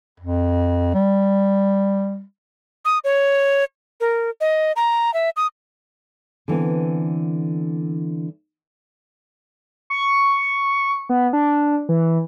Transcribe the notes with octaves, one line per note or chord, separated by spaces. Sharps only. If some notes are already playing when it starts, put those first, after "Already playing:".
F2
G3
D#6
C#5
A#4
D#5
A#5
E5
D#6
D3 E3 B3 C4
C#6
B3
D4
E3